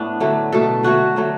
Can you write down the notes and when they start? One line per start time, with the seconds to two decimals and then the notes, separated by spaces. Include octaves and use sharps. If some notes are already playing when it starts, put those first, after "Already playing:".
Already playing: A2 B3 D4
0.20 D3 F#3 A3
0.52 B2 A3 A4
0.83 D3 F#3 A3 F#4
1.16 D3 F#3 A3